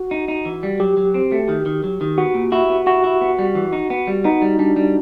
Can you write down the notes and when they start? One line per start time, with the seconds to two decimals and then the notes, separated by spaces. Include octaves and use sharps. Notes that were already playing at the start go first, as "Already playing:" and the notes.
Already playing: F#4
0.11 D#4
0.28 D#4
0.45 E3
0.63 G3
0.80 F#3 G4
0.97 F#3
1.14 C4
1.32 A3
1.49 D#3
1.66 D#3
1.84 F#3
2.01 D#3
2.18 B3 F#4
2.34 A#2
2.52 E4 F#4
2.70 B3
2.86 E4 F#4
3.04 E4
3.21 B3
3.39 G3
3.55 E3
3.73 D#4
3.90 B3
4.07 G3
4.24 B3 D#4
4.42 G3
4.59 G3 D4
4.76 G3